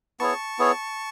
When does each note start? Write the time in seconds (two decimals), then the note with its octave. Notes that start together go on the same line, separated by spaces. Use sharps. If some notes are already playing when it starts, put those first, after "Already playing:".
0.20 B3 E4 G#4 C#5 A5 C#6
0.59 B3 E4 G#4 C#5